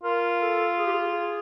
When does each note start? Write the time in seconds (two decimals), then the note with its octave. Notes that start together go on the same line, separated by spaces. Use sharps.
0.03 F4 A#4
0.41 A4
0.79 G#4
0.86 G4
0.93 G#4